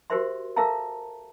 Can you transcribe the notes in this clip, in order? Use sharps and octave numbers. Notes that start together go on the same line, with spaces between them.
F#4 G4 A#4 C5 E5 C6
A4 A#4 E5 F5 A5 A#5